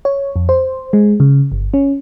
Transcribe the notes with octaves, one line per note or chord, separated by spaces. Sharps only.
C#5
F2
C5
G#3
C#3
G1
C#4